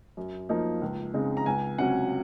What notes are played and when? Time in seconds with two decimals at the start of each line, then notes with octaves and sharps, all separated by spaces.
0.17 F#2
0.49 F3 A#3 D#4
0.82 C#2
1.14 C#3 G#3 C4 D#4
1.37 A#5
1.46 C#2 G#5
1.78 C3 F#3 C#4 F#5